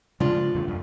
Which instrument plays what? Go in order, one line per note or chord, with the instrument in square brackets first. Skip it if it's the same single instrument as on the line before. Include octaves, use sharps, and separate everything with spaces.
[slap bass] C#3 F3 G#3 [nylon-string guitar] D4 F4
[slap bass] E2 G2 A3
F2